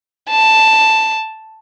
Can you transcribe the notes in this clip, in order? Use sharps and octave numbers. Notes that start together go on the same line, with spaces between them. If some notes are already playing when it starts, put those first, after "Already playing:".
A5